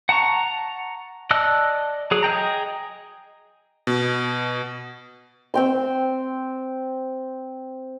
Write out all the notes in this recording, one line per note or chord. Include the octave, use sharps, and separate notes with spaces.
F#5 A5 A#5 C#6
D5 D#5 A5 E6 F#6
F#3 G#4
G#4 D#5 G5 A#5
B2
C4 G5 C6